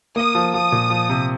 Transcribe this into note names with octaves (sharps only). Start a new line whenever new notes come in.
A#3 D#6
F3
F3 D#6
A#2
F3
C3